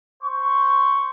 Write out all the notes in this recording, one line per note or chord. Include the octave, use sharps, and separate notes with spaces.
C5 C#6